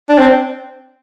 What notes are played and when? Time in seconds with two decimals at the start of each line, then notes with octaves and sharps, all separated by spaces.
0.09 D4
0.18 C4